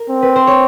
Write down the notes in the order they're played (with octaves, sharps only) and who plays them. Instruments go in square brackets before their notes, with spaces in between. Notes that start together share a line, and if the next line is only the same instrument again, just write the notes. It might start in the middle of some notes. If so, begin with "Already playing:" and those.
Already playing: [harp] A#4
[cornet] C4
[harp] B4
C5
C#5